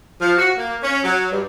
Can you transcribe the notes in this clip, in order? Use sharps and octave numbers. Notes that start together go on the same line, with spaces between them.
F3
F#4
A#3
C#4
F#3
G2